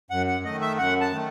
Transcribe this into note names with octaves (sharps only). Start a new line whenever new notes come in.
F#2 F#5
F#5
D#3 A3 D#5
E5
F#2 F#5
A5
D#3 A3